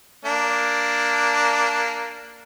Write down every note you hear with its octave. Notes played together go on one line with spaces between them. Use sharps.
A#3 D4